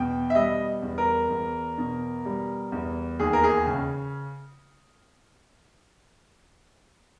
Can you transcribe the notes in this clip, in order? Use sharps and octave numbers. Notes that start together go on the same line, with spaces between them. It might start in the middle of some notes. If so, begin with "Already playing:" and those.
Already playing: E2 B2 G5
E5
G3 D#5
E2
A#4
E2
B2
G3
E2
D#2 G#4
A#4
G#4
C#3